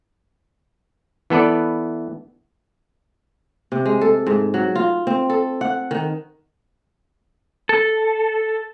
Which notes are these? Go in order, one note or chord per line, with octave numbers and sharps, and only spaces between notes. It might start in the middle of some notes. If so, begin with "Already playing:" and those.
E3 B3 A4 B4 D5
C3
G#3
A4
G#2
F#3
F4
C4
A4
F#5
D#3
A4